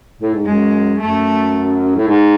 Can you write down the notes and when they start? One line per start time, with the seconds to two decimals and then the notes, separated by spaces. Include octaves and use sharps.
0.21 A2
0.34 G#2
0.46 F#2 G#3
1.00 F#2 A3
1.96 A2
2.07 G#2